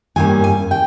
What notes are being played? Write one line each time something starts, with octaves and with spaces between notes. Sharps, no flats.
G2 G3 A#3 C#4 G#5
G#5
G5